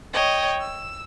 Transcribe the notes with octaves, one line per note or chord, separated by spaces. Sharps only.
C#5 D#5 G5
E6